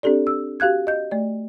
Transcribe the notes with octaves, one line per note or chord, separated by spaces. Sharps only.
C4 D4 G4 A4 D5
E6
F#4 G4 F5 F#6 G#6
D#5 G6
A3 D5